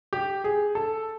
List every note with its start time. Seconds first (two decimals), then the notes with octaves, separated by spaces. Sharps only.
0.13 G4
0.44 G#4
0.75 A4